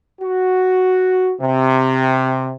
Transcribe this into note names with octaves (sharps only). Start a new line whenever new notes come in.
F#4
C3